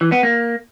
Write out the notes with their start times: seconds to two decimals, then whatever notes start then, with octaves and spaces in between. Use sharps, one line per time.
0.01 E3
0.12 B3
0.23 A#3